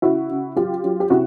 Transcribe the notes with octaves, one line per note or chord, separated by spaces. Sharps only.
C#3 E4 F#4
C#3
F#3 F4 G4
F#3
G4
C3 E4 F#4